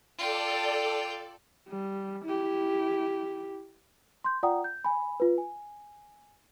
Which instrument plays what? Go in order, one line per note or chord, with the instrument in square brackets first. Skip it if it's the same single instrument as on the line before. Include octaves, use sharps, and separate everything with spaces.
[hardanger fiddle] F4 G5 [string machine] A4 D5
[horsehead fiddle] G3
E4 G4
[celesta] C6 G6
F4 D5 F#5 G5 A#5 D#6
G6
G#5 B5
F4 B4
G#5